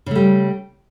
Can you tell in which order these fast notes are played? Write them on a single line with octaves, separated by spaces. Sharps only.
C#3 A3 G3